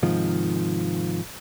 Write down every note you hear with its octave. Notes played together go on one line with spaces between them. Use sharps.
G#2 C3 D#3 F3